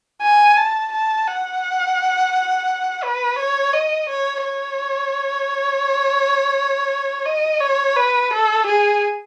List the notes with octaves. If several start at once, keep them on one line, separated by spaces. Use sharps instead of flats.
G#5
A5
A5
F#5
B4
C#5
D#5
C#5
C#5
D#5
C#5
B4
A4
G#4